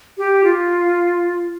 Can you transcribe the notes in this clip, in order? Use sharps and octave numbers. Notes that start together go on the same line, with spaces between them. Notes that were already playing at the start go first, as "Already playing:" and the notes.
G4
F4